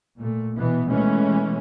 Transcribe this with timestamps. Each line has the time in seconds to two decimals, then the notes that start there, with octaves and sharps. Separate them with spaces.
0.17 A#2 A3
0.56 B2 E3 B3
0.89 B2 E3 G#3 A3 C#4